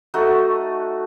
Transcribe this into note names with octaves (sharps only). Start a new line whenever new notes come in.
A3 D#4 F#4